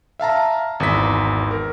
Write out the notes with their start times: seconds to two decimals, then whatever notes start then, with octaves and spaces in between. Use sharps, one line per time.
0.20 E5 F5 A5 A#5
0.80 G#1 E2 A#5 B6
1.51 A#4